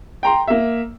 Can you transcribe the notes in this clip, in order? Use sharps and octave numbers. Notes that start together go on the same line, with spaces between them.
G5 A#5 C6
A#3 E5